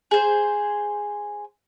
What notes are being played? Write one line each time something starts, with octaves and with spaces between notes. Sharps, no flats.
G#4 C5